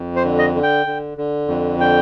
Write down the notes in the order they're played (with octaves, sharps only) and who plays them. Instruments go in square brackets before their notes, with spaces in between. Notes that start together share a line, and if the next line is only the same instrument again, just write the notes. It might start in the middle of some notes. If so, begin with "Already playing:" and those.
Already playing: [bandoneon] F2
C5
D3
D#5
D3
G5
D3
D3
F2
D3 G5